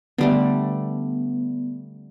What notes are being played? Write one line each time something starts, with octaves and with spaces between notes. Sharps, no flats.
D3 G3 A3 B3